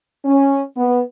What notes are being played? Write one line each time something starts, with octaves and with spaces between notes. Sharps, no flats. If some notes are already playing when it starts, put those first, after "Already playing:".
C#4
B3